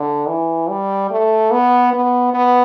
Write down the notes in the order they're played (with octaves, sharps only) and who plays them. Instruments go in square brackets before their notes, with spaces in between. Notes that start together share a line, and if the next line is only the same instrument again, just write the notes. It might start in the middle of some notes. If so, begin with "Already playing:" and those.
Already playing: [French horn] D3
E3
G3
A3
B3
B3
B3